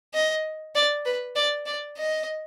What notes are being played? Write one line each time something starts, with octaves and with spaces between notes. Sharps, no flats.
D#5
D5
B4
D5
D5
D#5